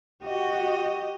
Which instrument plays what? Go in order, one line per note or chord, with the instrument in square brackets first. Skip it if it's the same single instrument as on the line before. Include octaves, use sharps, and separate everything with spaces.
[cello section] F#4 [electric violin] G4 D#5